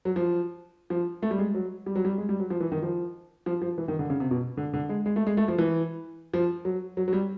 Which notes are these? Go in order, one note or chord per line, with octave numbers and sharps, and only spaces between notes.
F#3
F3
F3
A3
G3
G#3
F#3
G3
F#3
G3
G#3
G3
F#3
F3
E3
D#3
F3
F3
F3
E3
D#3
D3
C#3
C3
B2
D3
D3
G#3
G#3
A3
G#3
A3
F3
E3
F3
F#3
F#3
F#3
G3